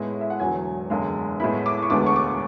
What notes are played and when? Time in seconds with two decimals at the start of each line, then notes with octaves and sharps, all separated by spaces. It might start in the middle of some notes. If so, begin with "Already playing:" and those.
Already playing: A2 G#3 B3 E4
0.21 E5
0.30 F#5
0.40 E1 E2 D3 F#3 G#5
0.90 F#1 E2 D3 G#3
1.40 A2 G#3 B3 E4 B5
1.66 D6
1.83 C#6
1.90 E1 D2 D3 G#3 B3 D6
2.06 C#6
2.16 D6